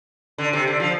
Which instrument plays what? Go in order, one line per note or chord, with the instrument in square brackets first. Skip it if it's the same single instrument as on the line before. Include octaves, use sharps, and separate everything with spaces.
[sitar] D3
C3
D3
F3